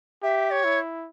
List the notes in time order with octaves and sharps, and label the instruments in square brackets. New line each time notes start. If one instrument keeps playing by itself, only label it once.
[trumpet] G4 [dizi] E5
[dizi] C#5
[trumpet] E4